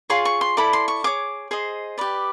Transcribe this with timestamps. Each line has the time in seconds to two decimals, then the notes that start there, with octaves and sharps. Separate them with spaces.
0.10 F4 G#4 C#5 C6
0.25 C#6
0.41 C6
0.57 E4 A4 D5 B5
0.73 C6
0.88 C#6
1.04 G#4 C#5 D6
1.51 G#4 C5 D#5
1.98 G4 B4 D5